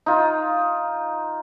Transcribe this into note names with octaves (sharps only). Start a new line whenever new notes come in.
D#4 F4